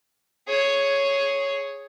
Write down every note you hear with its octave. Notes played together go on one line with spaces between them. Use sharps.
G#4 C#5